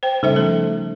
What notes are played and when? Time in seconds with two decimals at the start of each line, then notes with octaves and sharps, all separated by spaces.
0.03 C5 G5
0.23 C#3 G3 D#4 A4 C5 E5
0.36 F3 A3 A4